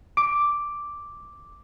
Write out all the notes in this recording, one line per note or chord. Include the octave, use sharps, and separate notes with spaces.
D6 D7